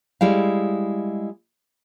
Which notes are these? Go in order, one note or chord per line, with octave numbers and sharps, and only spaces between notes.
G3 G#3 E4 F5